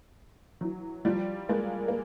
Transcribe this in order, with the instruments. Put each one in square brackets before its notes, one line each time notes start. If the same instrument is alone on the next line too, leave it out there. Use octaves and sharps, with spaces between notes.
[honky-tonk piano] E3 F#3
F3 G3
G#3 A#3
A#3